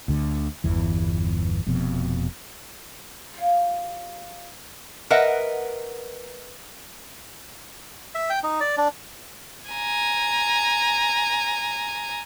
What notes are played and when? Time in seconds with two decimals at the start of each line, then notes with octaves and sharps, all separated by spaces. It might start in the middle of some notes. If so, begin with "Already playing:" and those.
0.08 D2 D3
0.64 G1 E2 E3
1.66 F1 F2 B2
3.34 F4 G4 C#5 F5
5.10 A#4 B4 D#5 E5 F#5
8.15 E5
8.30 G5
8.44 D#4
8.61 D5
8.77 D4
9.71 G#5 A#5